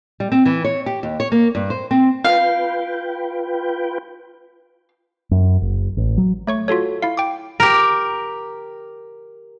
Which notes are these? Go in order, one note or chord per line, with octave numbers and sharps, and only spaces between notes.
G3
C4
E3
C#5
G4
D#2
C#5
A#3
G2
C5
C4
F4 B4 F5 G5
F#2
F#1
A1
F#3
A3 C#5 C#6
F4 F#4 A4 C#5
E4 F5
G5 D6
G4 A#4